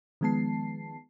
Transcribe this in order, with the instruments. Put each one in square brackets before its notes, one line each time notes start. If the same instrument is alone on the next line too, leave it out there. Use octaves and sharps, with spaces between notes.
[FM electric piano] D#3 F3 G#3 B3 A5 C7